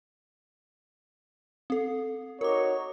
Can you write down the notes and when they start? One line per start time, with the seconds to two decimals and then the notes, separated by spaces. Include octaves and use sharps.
1.70 C4 A4
2.41 D#4 F#4 A#4 C#5 D6